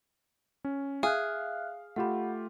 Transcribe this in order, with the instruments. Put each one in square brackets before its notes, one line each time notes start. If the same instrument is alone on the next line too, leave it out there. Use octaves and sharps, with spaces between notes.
[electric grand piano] C#4
[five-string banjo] G#4 [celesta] E5 F6 F#6 [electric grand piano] F5
[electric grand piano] A3 F4 G4 [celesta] F#5 B5